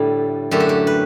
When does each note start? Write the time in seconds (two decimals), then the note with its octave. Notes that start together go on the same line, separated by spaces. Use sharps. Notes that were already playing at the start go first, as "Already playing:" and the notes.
Already playing: A2 D3 G3 A3
0.51 F#2 D3 A3 G4
0.60 F#4
0.69 G4
0.87 B4